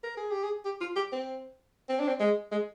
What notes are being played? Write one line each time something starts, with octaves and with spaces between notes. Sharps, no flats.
A#4
G#4
G4
G#4
G4
F4
G4
C4
C4
D4
C4
G#3
G#3